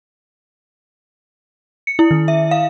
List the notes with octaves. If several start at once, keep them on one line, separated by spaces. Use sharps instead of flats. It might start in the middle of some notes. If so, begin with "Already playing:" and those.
C#7
E4
D#3
E5
F5